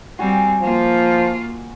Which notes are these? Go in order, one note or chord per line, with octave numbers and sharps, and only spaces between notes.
G3 C4 F#4 G#5
F3 A#3 F4